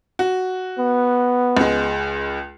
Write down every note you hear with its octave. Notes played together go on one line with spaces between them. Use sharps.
F#4
B3
C#2 G#3